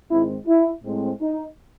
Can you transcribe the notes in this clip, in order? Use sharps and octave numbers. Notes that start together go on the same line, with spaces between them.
G#2 D#3 G#3 C4 E4
E4
A2 G#3 C4
D#4